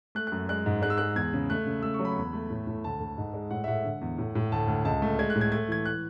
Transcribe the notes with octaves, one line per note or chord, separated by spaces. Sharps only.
A3 F#6
F#2 F#6
G#3 F#6
G#2
G#3 F#6
E6
G#3 F#6
E2 G#6
C#3
A3 F#6
C#3
A3 E6
C#6
F#3
B5
E2
A3
A2
A2
D2 A5
D2
G#2
G#3
A2 F#5
E5
A2 F#5
D3
E2
A2
A2
D2 A5
D2
C#2 A5
A3
G#3 G#6
F#6
A2
G#6
A3 G#6
E3 G#6
F#6